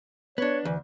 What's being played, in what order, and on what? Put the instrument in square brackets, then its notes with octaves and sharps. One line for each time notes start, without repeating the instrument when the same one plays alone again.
[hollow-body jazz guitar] B3 D4 [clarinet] C#5
[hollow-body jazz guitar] D2 [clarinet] E3